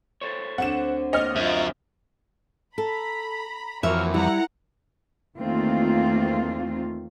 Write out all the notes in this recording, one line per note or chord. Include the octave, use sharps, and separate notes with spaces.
A4 C5 C#5
D2 D3 C4 F#5 E7
A#3 D4 C#5 D#5 F6
F#2 F4 E5
A4 A#5 B5
F2 E3 A#3 F#4 C#5 E5 F6
G3 E4 A#4 F#5 A#5
E2 D#3 A3 A#3 C4 F4